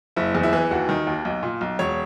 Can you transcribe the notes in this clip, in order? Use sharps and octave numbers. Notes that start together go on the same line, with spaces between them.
F#1 E4
E2
E4
E3
D#2 F#4
D#3
D#2
B1
A#2
B1
E1 C#5